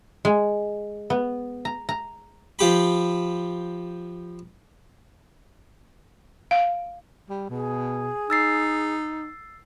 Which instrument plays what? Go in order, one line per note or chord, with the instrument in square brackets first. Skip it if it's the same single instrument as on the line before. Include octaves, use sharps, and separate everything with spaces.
[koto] G#3
B3
A#5
A#5
[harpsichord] F3 G4 B5
[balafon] F5
[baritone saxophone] G3
[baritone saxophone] B2 [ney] G#4
[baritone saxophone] D#4 [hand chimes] E6 A6 C7